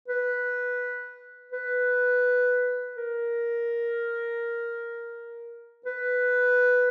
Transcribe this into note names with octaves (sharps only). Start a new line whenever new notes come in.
B4
B4
A#4
B4